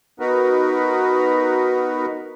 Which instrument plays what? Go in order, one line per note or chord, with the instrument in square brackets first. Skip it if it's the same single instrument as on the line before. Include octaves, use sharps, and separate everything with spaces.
[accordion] B3 D#4 F#4 A#4 B4